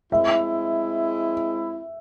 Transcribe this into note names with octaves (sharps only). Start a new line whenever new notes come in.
G#3 C4 E4 E5